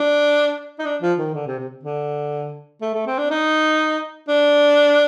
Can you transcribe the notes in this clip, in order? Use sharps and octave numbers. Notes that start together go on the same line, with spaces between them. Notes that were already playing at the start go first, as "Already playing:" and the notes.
Already playing: D4
D#4
D4
F3
D#3
D3
C3
C3
D3
A3
A3
C4
D4
D#4
D4